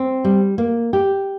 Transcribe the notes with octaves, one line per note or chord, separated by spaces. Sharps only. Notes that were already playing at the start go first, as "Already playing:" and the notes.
Already playing: C4
G3
A#3
G4